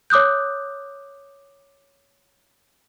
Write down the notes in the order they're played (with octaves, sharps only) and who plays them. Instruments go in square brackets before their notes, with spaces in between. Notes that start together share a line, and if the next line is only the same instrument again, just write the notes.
[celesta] C#5 D6 D#6 F#6 G6